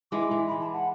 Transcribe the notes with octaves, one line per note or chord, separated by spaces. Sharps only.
E3 G#3 D6
E3
B5
A5
F#5